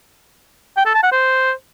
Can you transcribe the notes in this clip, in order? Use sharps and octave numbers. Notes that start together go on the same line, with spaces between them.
G5
A4
A5
F#5
C5